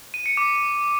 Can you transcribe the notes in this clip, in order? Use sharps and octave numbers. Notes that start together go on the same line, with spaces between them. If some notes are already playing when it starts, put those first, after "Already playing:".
D#7
C#7
D6